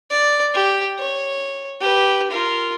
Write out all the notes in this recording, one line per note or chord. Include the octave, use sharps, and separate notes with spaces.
D5
G4
C#5
G4 B4
F4 A#4